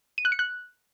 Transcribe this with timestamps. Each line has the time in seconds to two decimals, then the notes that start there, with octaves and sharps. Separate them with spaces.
0.18 D#7
0.25 F#6
0.32 C#7
0.39 F#6